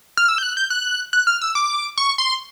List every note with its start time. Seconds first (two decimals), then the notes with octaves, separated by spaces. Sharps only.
0.17 F6
0.28 E6
0.38 G6
0.43 F#6
0.57 G6
0.70 F#6
1.13 F#6
1.27 F6
1.42 E6
1.55 D6
1.98 C#6
2.18 C6